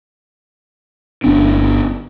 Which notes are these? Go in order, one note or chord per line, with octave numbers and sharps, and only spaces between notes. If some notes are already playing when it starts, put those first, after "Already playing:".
G1 B3 C#4 D4